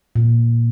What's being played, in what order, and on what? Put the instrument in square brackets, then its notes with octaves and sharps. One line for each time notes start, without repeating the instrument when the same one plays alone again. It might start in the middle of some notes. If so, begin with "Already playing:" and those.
[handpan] A#2